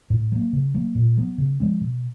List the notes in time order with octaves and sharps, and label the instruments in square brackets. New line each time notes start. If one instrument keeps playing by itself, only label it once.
[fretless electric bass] A2
F#3 A#3
C#3
F#3 A#3
A#2
F#3 B3
C#3
F3 G#3 C4
B2